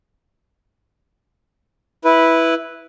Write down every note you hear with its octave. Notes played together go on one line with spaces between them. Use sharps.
E4 B4